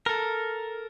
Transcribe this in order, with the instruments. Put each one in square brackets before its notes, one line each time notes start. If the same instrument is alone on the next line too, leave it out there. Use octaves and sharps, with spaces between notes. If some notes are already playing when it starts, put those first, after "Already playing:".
[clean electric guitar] A4 A#4